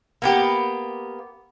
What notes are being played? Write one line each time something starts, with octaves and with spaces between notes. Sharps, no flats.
A#3 B3 G4